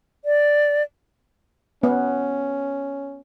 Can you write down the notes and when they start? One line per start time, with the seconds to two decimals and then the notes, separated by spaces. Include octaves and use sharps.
0.25 D5
1.83 B3 C#4